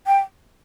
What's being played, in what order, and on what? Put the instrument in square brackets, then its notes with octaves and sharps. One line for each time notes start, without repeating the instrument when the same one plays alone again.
[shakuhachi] G5